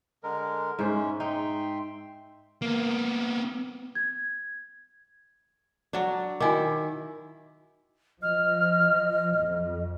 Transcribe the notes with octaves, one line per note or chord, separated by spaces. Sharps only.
D3 G#3 A#4
G#2 G#3 C#4 C5 E5
D#4 E5 G5 C6
A#3 B3
G#6
F#3 D4
D#3 E4 F#4 G#5 D6
F3 D#5 F6
F2